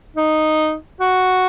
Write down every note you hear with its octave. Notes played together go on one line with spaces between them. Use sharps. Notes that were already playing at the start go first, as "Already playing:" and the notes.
D#4
F#4